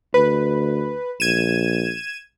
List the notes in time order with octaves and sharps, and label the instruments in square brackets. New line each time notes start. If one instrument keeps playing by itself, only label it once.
[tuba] D2 [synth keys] B4
[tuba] A#1 [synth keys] G#6 D#7 E7